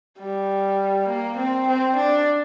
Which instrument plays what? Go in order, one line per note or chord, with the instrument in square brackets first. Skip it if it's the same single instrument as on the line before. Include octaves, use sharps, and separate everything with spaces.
[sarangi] G3
A#3
C4
C4
D4